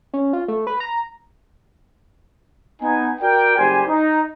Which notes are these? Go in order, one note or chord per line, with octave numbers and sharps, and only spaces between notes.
C#4
F4
A3
B4
A#5
B3 D#4 G#5
F#4 A#4 D5 G5
F#1 G3 G4 C5 G#5
D#4